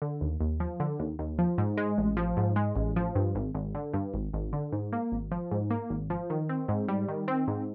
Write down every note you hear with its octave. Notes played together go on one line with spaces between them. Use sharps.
D3
D#2
D#2
F3
D3
D#2
D#2
F3
G#2
G#3
A1
F3
G#2
G#3
A1
F3
G2
G#1
G#1
D3
G2
G#1
G#1
D3
G#2
A#3
G#1
F3
G#2
A#3
G#1
F3
D#3
C4
G#2
G3
D#3
C4
G#2